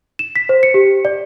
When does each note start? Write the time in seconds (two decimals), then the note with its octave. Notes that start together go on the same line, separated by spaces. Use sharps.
0.19 E7
0.36 B6
0.49 C5
0.63 C#7
0.74 G4
1.05 D5